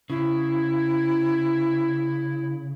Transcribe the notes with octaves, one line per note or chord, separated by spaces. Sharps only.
C#3 E4